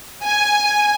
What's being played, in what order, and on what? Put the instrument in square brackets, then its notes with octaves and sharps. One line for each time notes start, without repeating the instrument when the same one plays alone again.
[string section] G#5